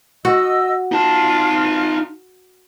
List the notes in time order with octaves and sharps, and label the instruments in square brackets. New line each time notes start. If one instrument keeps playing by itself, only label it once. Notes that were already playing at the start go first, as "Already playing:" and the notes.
[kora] F#4 [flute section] D#5 E6
[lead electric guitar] D#4 A5 [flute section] F4